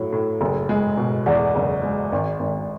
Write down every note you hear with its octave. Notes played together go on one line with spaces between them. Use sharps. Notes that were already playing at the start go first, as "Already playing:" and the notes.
Already playing: A2 F#3 C#5
A2
F#1
G#3
B2
E2 D5 F#5
F#1
G#3
G#1
G#1